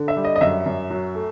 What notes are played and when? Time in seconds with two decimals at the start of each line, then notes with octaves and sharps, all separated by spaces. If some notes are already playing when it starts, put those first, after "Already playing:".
Already playing: D3
0.08 E5
0.17 G3
0.25 D#5
0.36 D#5
0.41 F#2 E5
0.66 F#2
0.90 F#3
1.15 A3